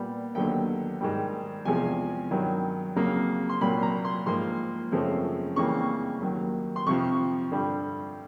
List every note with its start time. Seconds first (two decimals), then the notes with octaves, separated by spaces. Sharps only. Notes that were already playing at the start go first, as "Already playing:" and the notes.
Already playing: A#2 G3 B3
0.35 D#2 D3 F#3 B3 G5
1.00 G#2 D#3 G3
1.65 E2 C3 F3 G#3 G#5
2.31 G2 D#3 F#3
2.96 F2 C#3 F#3 A#3
3.49 C6
3.61 C2 A#2 F#3 A#3 B5
3.83 A#5
4.05 C6
4.26 G#2 F3 A#3 C6
4.92 F#2 C#3 F3 A3 C4
5.56 F2 C#3 E3 G3 A#3 C#6
6.22 D#2 D#3 F#3
6.76 C6
6.86 F2 C3 F3 C#6
7.52 G2 D3 G3